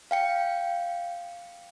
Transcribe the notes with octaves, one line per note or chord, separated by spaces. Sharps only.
F5 G5 C#7